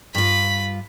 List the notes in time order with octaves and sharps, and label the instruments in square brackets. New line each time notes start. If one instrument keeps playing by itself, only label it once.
[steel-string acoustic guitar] G2 F4 [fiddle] B5